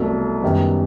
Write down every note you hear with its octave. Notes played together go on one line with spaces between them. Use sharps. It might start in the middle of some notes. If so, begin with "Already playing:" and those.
Already playing: C2 B2 F#3 A3
F#2 D#3 G3 B3